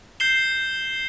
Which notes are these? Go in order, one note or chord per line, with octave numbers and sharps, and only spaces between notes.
G6 C7 E7 G7